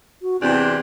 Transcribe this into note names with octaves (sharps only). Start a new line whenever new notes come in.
F#4
E2 C3 C4 D4